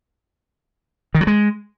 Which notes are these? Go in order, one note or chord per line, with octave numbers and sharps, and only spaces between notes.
D#3
F#3
G#3